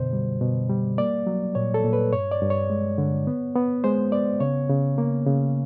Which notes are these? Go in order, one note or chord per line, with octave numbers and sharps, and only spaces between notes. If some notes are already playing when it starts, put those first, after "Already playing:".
Already playing: F#2 B2 D3 C5
G3
B2
G3
A#3 D5
F#3
A#2 C#5
A4
A#2
B4
G2 C#5
D5
G2
C#5
G#3
D3
B3
B3
G#3 C5
B3 D5
C#3 C#5
C#3
A#3
C#3